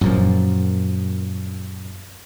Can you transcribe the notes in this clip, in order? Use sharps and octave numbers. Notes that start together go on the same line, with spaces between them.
F#2 A#2 F3